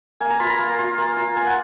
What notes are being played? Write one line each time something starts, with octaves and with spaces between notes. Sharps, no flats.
A#3 G#5
A#5
F4 B5
A#5
A#3
F4
A#3
F4
A#3 G#5
F#5